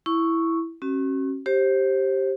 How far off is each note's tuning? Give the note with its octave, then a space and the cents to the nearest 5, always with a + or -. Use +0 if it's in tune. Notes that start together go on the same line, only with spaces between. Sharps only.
E4 +0 C#6 +0
C#4 -35 F#4 +35
G4 -5 C5 +25